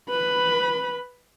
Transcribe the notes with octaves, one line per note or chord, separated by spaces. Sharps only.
B4 B5